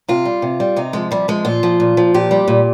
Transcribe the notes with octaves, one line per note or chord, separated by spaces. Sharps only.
C3 F4
G3
C3
G3
C3 D#4
F3 G#3
C3 G3
F3 G#3
A#2 F4
F3
A#2
F3
A#2 G4
G3
A#2